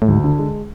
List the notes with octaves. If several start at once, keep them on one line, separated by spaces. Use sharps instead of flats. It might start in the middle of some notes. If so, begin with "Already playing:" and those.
A2
D2 G#2
D3
G#3